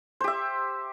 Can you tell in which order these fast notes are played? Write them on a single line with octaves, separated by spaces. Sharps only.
C5 G4 E5